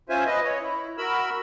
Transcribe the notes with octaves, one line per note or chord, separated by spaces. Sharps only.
C#4 F4 C5 E5 G#5
B4 D#5
C#5
E4
F#4 A#4 B5 E6